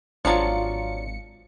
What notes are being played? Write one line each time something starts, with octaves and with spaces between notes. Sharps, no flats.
G#1 F3 F#3 D4 F4 C#7